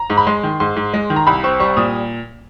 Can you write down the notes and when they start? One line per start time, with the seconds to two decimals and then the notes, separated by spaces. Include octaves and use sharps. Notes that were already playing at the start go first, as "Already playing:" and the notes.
Already playing: A#5
0.10 G#2
0.17 B5
0.27 G#3 C6
0.44 D#3
0.60 G#2 C6
0.76 G#2
0.94 G#3
1.10 D#3
1.16 A#5
1.27 C2 B5
1.44 C4 C#6
1.60 G3 C#6
1.77 A#2 D#6